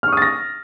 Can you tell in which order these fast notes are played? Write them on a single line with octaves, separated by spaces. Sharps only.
F6 C#6 D#6 A6 A#6